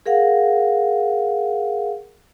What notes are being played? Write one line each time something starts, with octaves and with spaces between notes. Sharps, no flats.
G#4 A#4 F5 F#5